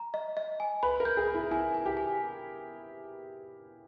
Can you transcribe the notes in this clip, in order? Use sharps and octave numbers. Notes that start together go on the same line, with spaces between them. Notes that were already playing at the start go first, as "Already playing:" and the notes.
Already playing: A#5
D#5
D#5
G#5
B4 B5
A#4
G6
G#4
B5
E4
E4 G#5
G#5
G4
G#5